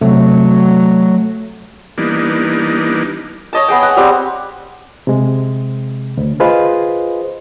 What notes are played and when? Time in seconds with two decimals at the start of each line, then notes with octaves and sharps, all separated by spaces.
0.01 C3 F#3 A3
1.98 E3 G3 A#3 B3 D4 D#4
3.53 C#5 D#5 A5
3.68 B3 G#4 G5
3.83 F#5
3.97 G3 C4 G4
5.07 C3 G#3
6.17 D2
6.40 F4 G#4 B4 C5 D#5 F5